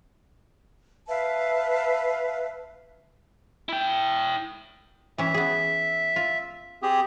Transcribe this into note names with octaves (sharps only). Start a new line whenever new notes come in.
B4 E5 F5 A5
E4 G5
E3 C#4 E5
B3 G#4
F4
C4 G4 G#4